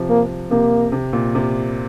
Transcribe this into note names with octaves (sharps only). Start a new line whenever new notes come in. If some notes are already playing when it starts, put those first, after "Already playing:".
Already playing: C3 F3
A#3
C3 A#3
C3
A#2
C3